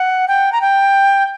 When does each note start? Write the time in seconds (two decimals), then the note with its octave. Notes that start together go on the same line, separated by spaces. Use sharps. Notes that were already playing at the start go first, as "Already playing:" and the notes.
Already playing: F#5
0.28 G5
0.52 A#5
0.61 G5